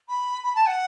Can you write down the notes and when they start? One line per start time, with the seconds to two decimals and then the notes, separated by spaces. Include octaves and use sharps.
0.08 B5
0.43 B5
0.55 A5
0.67 F#5